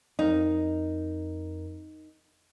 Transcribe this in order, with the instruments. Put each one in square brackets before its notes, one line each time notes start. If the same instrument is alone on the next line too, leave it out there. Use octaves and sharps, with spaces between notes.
[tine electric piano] F2 A#4 [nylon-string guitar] D#4